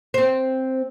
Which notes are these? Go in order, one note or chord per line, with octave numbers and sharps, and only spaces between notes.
C4 C5